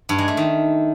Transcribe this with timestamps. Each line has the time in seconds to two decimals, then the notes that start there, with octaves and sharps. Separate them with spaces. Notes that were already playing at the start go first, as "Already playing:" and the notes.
0.09 G2
0.18 G#3
0.28 A3
0.37 D#3